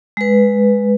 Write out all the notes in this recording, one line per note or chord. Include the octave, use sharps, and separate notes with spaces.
G#3 B4